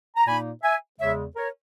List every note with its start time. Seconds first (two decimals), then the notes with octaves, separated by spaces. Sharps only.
0.16 A#5
0.26 A#2 A#3 D#4 G#5 B5
0.63 E5 G#5
0.99 E2 C#3 G#3 C#5 E5
1.36 A#4 C#5